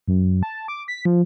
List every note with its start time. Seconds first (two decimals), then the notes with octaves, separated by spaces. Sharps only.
0.08 F#2
0.43 A5
0.68 D6
0.88 B6
1.05 F3